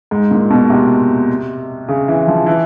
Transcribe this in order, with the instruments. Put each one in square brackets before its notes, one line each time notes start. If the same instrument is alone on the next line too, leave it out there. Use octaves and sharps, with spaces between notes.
[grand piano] G#2
A#2
B2
C3
C#3
E3
F3
E3